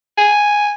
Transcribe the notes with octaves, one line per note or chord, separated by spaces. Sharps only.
G#5